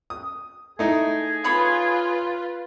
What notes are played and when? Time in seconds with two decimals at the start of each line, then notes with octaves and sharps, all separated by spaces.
0.10 D#6
0.79 A3 D#4 E4 G#4
1.44 F4 B4 C#5 B5 D#6